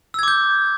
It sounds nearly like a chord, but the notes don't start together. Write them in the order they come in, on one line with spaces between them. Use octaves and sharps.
E6 G#6 D6 G6